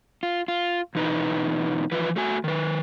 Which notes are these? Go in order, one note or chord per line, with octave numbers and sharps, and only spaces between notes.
F4
F4
E2 B2 E3 D#4 B4
E3 F3 F4 B4
A3 F#4 G#5
D#3 B4